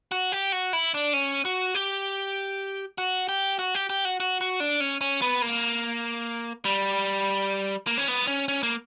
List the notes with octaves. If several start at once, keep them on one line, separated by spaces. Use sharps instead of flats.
F#4
G4
F#4
E4
D4
C#4
F#4
G4
F#4
G4
F#4
G4
G4
F#4
F#4
F#4
D4
C#4
C#4
B3
A#3
G3
A#3
C#4
B3
C#4
C#4
A#3